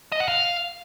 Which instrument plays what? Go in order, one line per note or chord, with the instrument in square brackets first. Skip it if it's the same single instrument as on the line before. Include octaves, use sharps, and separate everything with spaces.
[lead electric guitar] D#5
F#5
F5